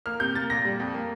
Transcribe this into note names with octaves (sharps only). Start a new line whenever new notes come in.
A#3 F6
C3 G6
A#3 A6
A#2 A#6
G3
F2
A#3